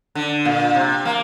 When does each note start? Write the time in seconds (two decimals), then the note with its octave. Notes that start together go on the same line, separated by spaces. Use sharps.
0.15 D3
0.45 A#2
0.75 C3
1.05 A#3